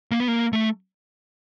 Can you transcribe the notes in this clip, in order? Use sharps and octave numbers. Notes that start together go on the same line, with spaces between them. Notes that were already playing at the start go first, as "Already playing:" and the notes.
A#3
B3
A#3
A3